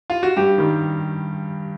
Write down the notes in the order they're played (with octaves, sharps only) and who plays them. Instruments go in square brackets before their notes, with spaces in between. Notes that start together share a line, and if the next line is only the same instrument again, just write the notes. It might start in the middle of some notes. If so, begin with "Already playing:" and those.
[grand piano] F4
F#4
G2 G4
D#3 G3